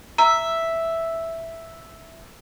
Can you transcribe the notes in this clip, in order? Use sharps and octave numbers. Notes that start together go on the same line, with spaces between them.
E5 A#5